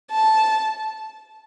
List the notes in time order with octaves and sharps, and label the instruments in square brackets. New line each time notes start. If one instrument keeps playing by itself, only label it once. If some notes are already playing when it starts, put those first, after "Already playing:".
[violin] A5